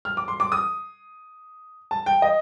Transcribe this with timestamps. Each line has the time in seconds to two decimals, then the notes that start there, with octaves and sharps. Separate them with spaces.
0.05 F6
0.17 D6
0.28 C6
0.40 D6
0.52 D#6
1.91 A5
2.06 G5
2.22 D#5